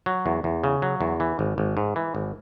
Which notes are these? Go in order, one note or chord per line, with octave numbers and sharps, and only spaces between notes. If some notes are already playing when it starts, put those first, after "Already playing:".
F#3
E2
E2
C#3
F#3
E2
E3
G#1
G#1
G#2
E3
G#1